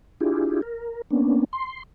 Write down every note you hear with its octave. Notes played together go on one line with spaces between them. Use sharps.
D4 E4 F4 G4 G#4
A#4
A#3 B3 C#4 D4
C6